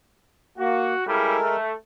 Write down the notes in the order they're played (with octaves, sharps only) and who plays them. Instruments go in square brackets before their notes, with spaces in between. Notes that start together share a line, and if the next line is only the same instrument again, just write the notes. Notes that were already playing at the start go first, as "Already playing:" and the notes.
[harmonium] A#3 [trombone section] F#4
[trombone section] C#3 G3 E4 [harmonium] G#3 A4 A#4
[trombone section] A3